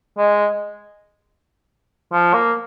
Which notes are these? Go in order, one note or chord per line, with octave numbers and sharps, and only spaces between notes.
G#3
F3
A#3